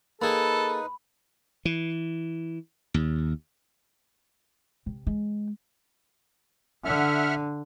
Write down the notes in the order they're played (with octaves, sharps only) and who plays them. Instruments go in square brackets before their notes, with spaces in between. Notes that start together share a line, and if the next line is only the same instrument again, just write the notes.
[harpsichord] A#3 G#4 [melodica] D#4 B4 [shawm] A4 [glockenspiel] B5
[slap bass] E3
D#2
[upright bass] C3
G#3
[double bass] D3 [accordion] E5 F#5 F6